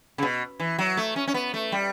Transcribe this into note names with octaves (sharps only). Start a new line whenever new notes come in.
C#3
B2
E3
F#3
A3
C#4
C#4
B3
A3
G3